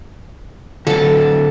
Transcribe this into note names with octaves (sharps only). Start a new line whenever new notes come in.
D3 F#3 A4 A5